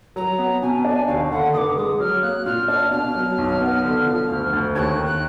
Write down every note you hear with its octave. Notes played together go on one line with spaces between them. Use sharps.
F#3 A#5
B3
B2 G#5
D4
D#2 F5
D3 F#5
F1 D6 D#6
G#3 D#6
F#3 F6
A#3 F#6
A#2 F6
D4 F6
B2 F6
F#3
B1
B3
D3
F3
D2
D2
D#2 F#6 G#6
D#3
F#6